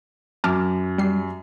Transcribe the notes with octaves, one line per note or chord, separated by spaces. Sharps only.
F#2 A5 D6 F6
G3 C7